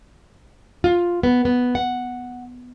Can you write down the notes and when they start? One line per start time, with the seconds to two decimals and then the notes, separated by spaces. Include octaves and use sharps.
0.84 F4
1.23 B3
1.45 B3
1.75 F#5